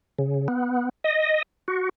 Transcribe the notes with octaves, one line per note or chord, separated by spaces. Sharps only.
C#3
B3
D#5
F#4